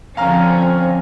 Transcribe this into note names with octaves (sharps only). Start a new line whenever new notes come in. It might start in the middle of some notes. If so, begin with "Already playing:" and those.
D3 F3 C4 C#4 F5 A#5 F6